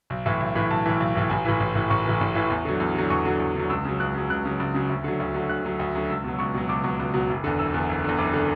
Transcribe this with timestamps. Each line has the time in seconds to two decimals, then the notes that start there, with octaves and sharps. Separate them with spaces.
0.10 B1
0.26 A2 E3
0.40 B1
0.55 A2 E3
0.70 B1 A5
0.86 A2 E3
1.00 B1
1.15 A2 E3
1.30 A1 G#5
1.45 A2 E3
1.60 A1
1.75 A2 E3
1.90 A1 C#6
2.05 A2 E3
2.21 A1
2.35 A2 E3
2.50 E2
2.65 D3 F#3
2.80 E2
2.95 D3 F#3
3.10 E2 C#6
3.25 D3 F#3
3.39 E2
3.55 D3 F#3
3.70 C#2 E6
3.85 C#3 F#3
4.00 C#2 F#6
4.14 C#3 F#3
4.30 C#2 F#6
4.45 C#3 F#3
4.60 C#2
4.74 C#3 F#3
4.89 D2
5.04 D3 F#3
5.20 D2
5.34 D3 F#3
5.49 D2 F#6
5.65 D3 F#3
5.79 D2
5.95 D3 F#3
6.10 C#2 E6
6.24 B2 F#3
6.39 C#2 C#6
6.54 B2 F#3
6.69 C#2 D6
6.84 B2 F#3
6.99 C#2
7.14 B2 F#3
7.29 F#1
7.44 E2 D3
7.59 F#1 E6
7.74 E2 D3
7.89 F#1
8.04 E2 D3
8.18 F#1 D6
8.33 D3